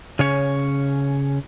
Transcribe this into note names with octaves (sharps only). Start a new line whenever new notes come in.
C#3 C#4 C#5